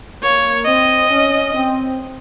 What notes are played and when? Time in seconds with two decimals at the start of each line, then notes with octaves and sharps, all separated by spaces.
0.22 A#3 C#5
0.65 C4 D#5
1.10 C#4
1.53 C4